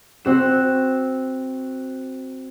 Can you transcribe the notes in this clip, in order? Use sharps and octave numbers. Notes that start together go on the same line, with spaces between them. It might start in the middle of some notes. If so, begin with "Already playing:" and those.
C4 F#4 E7